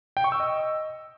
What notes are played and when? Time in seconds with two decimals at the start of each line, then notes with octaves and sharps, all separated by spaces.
0.17 G5
0.24 C#6
0.32 E6
0.40 D#5